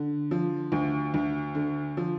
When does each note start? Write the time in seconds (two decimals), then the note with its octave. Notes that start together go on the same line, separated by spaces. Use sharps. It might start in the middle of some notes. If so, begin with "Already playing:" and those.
Already playing: D3
0.31 F3
0.72 D2
1.14 D2
1.55 D3
1.97 F3